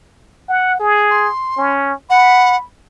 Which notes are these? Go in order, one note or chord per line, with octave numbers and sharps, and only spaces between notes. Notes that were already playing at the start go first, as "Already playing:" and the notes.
F#5
G#4
C6
C#4
F#5 B5